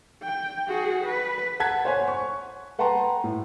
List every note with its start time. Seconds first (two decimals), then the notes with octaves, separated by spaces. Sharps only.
0.23 G5
0.68 F#4 G#4
1.05 B4
1.60 F#5 A5 F#6 G#6 B6
1.85 C5 C#5 F#5 G#5
2.08 C#6
2.79 B4 F#5 G5 A5 A#5 C6
3.24 A2